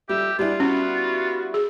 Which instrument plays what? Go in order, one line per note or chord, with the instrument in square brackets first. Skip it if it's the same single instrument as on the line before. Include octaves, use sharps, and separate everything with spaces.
[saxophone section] F2 E5 [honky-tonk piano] G3 [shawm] G4
[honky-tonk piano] G3 E4 [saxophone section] G#3 B3 D4 [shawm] F4
[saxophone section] B3 F#4 [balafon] C#4
[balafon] G#4